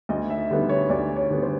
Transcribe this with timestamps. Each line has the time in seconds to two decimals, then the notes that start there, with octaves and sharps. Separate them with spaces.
0.09 D2 D#5
0.30 E5
0.50 D3 G3 B3
0.69 C#5
0.89 D2 D5
1.16 C#5
1.30 D3 G3 B3
1.43 C5